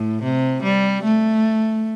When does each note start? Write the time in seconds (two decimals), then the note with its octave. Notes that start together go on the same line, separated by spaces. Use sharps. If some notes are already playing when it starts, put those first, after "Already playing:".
Already playing: A2
0.23 C3
0.63 G3
1.04 A3